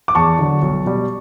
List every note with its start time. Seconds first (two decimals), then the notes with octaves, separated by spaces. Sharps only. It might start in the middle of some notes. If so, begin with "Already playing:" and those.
0.08 D6
0.15 E2 A5 C#6
0.39 D3 F#3
0.62 B1
0.86 B2 G3